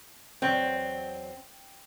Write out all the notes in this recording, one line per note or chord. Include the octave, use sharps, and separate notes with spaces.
E2 F#3 C4 D5